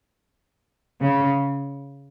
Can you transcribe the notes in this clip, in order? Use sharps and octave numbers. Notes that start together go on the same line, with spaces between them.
C#3